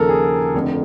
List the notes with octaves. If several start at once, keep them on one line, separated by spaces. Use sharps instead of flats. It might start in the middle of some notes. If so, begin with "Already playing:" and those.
Already playing: D#2 C#3 F3 A4 A#4
G#4
F1 F2 D3